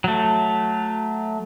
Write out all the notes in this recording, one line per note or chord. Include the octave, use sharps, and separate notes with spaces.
F#3 A3